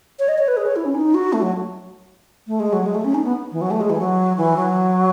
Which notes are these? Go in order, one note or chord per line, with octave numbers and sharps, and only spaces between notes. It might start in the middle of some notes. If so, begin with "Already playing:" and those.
C#5
D#5
C#5
B4
G#4
C#5
E4
C#4
D#4
F#4
A3
F#3
A3
G#3
F#3
G#3
A3
C#4
D#4
B3
E3
F#3
A3
G#3
E3
F#3
E3
F#3